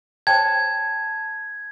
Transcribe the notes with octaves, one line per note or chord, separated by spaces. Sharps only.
C5 C#5 G5 A5 G#6